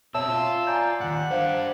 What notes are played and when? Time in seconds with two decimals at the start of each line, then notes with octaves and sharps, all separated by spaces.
0.14 B2 C4 C#5 E5 A5 E6
0.29 F4
0.67 D5 G#5 A#5 G6
1.00 D#2 G#2 F#5
1.31 D4 G4 C5 F5